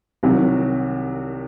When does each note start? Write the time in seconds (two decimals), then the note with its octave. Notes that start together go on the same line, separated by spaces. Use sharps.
0.23 C2 C3 D#3 F#3